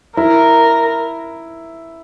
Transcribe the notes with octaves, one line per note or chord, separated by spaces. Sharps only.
E4 A#4